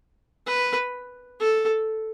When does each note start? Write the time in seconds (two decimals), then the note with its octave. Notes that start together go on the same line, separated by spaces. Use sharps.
0.47 B4
1.40 A4